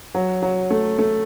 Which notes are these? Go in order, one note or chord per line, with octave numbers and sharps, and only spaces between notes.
F#3
F#3
A3
A3